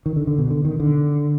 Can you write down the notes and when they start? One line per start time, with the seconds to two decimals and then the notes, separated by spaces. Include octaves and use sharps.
0.06 D#3
0.16 D3
0.27 D3
0.38 B2
0.50 D3
0.65 D#3
0.80 D3